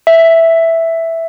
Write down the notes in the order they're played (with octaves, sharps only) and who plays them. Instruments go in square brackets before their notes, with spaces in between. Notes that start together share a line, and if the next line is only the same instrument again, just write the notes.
[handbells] E5